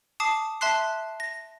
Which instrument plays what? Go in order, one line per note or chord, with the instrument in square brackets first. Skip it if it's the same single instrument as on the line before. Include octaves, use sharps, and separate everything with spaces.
[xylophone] A5 D6 D#6 C7
E5 A5 C6 F#6 C7
A#6